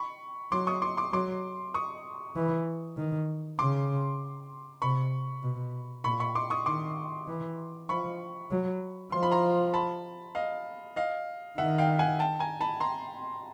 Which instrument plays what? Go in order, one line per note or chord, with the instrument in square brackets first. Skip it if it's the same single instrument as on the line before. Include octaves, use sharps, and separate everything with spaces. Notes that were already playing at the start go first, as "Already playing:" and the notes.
Already playing: [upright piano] B5 C#6
[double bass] F#3 [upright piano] C6 D6
[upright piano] C#6 D#6
C6 D6
C6 D6
[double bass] F#3 [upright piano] C6 D6
[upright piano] C#6 D#6
[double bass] E3
D#3
[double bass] C#3 [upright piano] C6 D6
[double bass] C3 [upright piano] B5 C#6
[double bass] B2
[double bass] A#2 [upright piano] B5 C#6
[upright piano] B5 C#6
C6 D6
C#6 D#6
[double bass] D#3 [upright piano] C6 D6
[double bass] E3
[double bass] F3 [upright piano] B5 C#6
[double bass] F#3
[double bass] F3 [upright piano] C6
[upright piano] B5
A#5 C6
A5 B5
D#5 F5
D#5 F5
[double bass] D#3 [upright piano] E5 F#5
[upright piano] F5 G5
F#5 G#5
G5 A5
G#5 A#5
A5 B5
A#5 C6